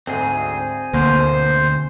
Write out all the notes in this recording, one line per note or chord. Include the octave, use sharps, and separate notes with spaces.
D2 G#2 C4 G#4
D2 B2 D3 A#3 C5